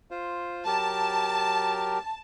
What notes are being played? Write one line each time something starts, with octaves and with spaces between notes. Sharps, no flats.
F4 C5
F#3 G4 A#4 A5